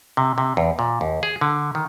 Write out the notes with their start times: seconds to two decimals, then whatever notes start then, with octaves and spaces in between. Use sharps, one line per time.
0.17 C3
0.38 C3
0.57 E2
0.79 A#2
1.01 D#2
1.23 G#4
1.41 D3
1.75 D#3